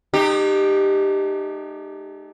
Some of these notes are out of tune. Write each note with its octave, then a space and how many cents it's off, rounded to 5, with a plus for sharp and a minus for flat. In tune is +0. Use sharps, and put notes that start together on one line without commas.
A3 -45 D#4 -35 G4 +0